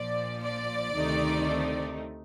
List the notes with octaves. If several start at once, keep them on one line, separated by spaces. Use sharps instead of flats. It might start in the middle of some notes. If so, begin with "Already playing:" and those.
Already playing: A#1 A#2 F3 D5
D5
D2 C3 D#3 A3 D#4